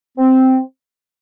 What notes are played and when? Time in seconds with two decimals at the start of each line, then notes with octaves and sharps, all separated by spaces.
0.16 C4